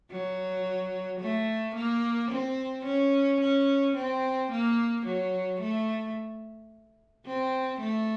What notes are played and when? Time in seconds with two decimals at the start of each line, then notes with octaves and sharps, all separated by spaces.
0.11 F#3
1.20 A3
1.75 A#3
2.31 C4
2.85 C#4
3.40 C#4
3.95 C4
4.51 A#3
5.06 F#3
5.60 A3
7.26 C4
7.80 A3